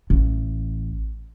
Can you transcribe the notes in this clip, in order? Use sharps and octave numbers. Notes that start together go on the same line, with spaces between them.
A1